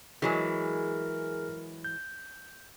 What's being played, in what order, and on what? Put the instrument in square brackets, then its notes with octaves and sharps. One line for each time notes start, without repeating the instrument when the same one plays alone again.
[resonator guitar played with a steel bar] E3 F#3 G#3 [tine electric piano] G#4 G#5 [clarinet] A#4
[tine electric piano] G6